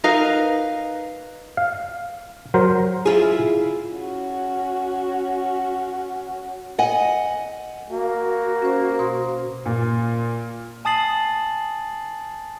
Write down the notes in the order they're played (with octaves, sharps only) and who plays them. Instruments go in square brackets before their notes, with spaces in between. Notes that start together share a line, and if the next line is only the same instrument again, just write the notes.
[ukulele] D#4 A#4 B4 F5
[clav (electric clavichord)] F5
F#3 A#4 C5
[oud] E4 F4 G#4
[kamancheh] C#4 F#4
[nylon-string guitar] D#5 F#5 G#5
[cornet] A#3 [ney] F#4
[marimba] C#4 C5
B2 C5 C6
[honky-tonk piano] A#2
[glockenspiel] G#5 A5 D#6 A6 C7 F#7